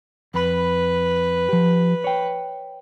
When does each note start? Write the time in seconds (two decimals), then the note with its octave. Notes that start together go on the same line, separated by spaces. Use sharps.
0.34 F2 B4 B5
1.49 F3 G4
2.04 C#5 G5